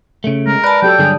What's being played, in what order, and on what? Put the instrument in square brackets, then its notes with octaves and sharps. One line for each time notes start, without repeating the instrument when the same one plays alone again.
[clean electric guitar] C#3 A3
[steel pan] G#3 [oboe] A#4
[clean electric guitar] B4 [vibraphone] D5 A5
[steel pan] F#3 G4 A4 [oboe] G5
[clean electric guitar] G2 F#3 G3 [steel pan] D3 G#4